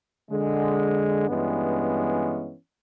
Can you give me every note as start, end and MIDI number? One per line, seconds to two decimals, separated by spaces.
0.31 1.26 50
0.31 1.26 56
1.29 2.53 43
1.29 2.53 52
1.29 2.53 56
1.29 2.53 59
1.29 2.53 61